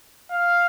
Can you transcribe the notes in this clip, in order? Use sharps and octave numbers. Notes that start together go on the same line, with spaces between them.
F5